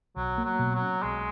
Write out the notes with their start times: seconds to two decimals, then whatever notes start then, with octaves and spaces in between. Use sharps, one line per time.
0.16 B1 F#3
0.38 A#3
0.45 F#3
0.59 B2
0.75 F#3
0.82 C#4
1.03 B1 G#3